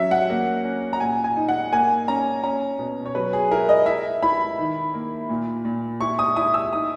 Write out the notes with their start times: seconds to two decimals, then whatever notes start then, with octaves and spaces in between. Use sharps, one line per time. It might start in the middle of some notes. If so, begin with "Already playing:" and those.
Already playing: F#3 C#4 E5
0.11 F#5
0.30 A#3
0.64 C#4
0.93 A#5
1.00 A#2 G#5
1.24 G#5
1.36 D#4
1.49 F#5
1.72 A#3 G#5
2.08 C#4 A#5
2.43 C#4 A#5
2.79 B2
3.06 C#5
3.15 F#3 B4
3.33 G#4
3.51 E4 A#4
3.69 D#5
3.86 E4 E5
4.23 E4 B5
4.59 D#3
4.94 A#3
5.29 A#2
5.65 A#2
6.01 E4 C#6
6.19 D#6
6.36 E4 D#6
6.54 E6
6.72 D#4 D#6